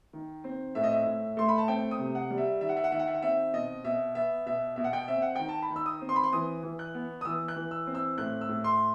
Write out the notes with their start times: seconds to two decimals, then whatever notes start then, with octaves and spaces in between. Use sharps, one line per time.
0.13 D#3
0.44 C4
0.75 A2 E5
0.84 D#5
0.91 E5
1.06 A2
1.37 A3 C6
1.49 B5
1.58 A5
1.68 C4 G5
1.91 D#6
1.99 C3
2.15 F#5
2.31 G3
2.38 E5
2.61 D#3 E5
2.69 F#5
2.77 E5
2.84 F#5
2.92 D#3 E5
2.99 F#5
3.07 E5
3.15 F#5
3.22 C4 E5
3.54 B2 D#5
3.85 B2 E5
4.15 B3 E5
4.46 B2 E5
4.76 B2 E5
4.84 F#5
4.93 G5
5.08 C4 E5
5.22 F#5
5.36 D#3 G5
5.49 A5
5.62 B5
5.70 D#3
5.76 E6
5.86 D#6
6.01 C4
6.09 C6
6.16 B5
6.23 C6
6.32 E3 D#6
6.63 E3
6.79 F#6
6.94 B3
7.21 D#6
7.25 E3 E6
7.48 F#6
7.56 E3
7.71 E6
7.87 C4
7.95 E6
8.18 A2 F#6
8.41 E6
8.49 A2
8.64 C6